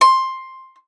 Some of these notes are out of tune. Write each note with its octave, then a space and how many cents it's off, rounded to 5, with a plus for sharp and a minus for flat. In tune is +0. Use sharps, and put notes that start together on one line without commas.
C6 +10